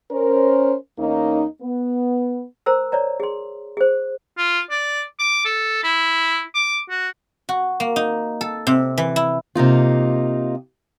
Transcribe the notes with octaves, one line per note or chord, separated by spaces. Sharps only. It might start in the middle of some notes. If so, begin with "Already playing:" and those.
C#4 A#4 C5
E2 A#3 C#4 D#4
B3
A#4 C5 A#5 E6
C#5 D5 A#5
G#4 C6
G#4 C5
F4
D5
D6
A4
E4
D6
F#4
F#4
A#3
D#4
A4
C3
E3
E4
C3 A#3 D#4 F4